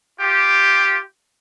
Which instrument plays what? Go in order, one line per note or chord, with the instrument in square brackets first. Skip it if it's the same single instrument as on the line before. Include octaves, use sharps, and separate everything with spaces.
[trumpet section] F4 G4